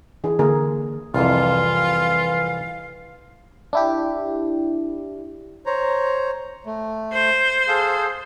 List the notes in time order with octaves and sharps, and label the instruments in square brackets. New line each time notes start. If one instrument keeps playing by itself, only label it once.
[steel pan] E3 D4 G#4
D3 A#3 D4 G#4 A#4
[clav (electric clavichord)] C2 F2 [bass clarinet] E3 [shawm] F4 [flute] F5
[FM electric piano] D4 E4 G4
[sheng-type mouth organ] C5 C#5 A#5
A3
[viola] C5
[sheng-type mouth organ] G#4 A4 F5